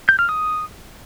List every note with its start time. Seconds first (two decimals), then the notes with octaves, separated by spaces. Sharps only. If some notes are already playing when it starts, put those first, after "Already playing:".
0.09 G6
0.19 F6
0.29 D#6